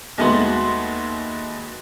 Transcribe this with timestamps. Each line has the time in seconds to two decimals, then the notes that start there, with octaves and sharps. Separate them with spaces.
0.18 D#2 G#3 A3 B3 F#4 C6